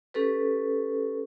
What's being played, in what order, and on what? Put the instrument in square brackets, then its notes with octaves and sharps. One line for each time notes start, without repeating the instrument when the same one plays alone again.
[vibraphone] C#4 G4 A4 B4